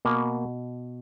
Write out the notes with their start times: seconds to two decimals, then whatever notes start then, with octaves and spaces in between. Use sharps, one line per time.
0.05 B2 A#3